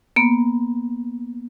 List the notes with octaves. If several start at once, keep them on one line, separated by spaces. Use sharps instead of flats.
A#3 B3